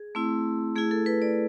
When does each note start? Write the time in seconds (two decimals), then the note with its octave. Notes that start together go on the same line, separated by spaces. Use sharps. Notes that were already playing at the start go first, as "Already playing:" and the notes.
Already playing: G#4
0.15 A3 C4 E4
0.75 A3 E4 G#4
0.91 A4
1.06 B4
1.22 D5